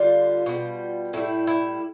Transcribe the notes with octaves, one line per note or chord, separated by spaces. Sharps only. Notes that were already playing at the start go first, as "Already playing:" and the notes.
Already playing: D3 G3 F4
B2 G3
A2 G3 E4
E4